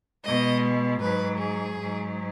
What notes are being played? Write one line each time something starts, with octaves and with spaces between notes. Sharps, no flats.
B2 G#3 D#5
G#2 F#3 B4
G#4
G#2 F#3